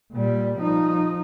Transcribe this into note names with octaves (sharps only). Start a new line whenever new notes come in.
A#2 G3
F3 D#4